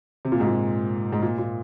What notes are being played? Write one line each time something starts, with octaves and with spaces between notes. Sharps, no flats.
C3
A#2
G#2
A#2
G#2
A#2
A#2